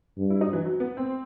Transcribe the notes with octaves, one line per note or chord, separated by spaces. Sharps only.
G2
E4
D#4
E3
F#3
B3
C4